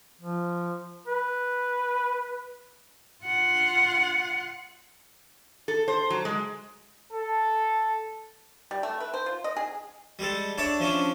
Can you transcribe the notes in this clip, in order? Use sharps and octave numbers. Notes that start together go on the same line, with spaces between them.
F3
B4
F4 F#5
A4
C5
F#3
G#3
A4
G3
A3
B4
C5
F4
D#5
G#4
G3 G#3 A4
D4 C#5 D5 E5
F3 C#4 D4